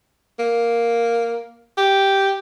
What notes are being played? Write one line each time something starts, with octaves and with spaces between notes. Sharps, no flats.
A#3
G4